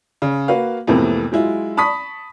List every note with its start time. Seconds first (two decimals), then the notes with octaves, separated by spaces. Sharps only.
0.22 C#3
0.48 A#3 F#4 B4 F5
0.88 F2 A2 C3 E3 A#3 B3
1.32 F#3 G#3 E4 F4
1.77 A5 B5 C#6 D#6 B6